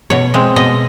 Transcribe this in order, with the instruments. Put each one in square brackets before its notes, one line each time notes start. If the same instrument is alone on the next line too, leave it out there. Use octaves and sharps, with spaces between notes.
[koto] B2 C#5
G#3 C4
B2 D#5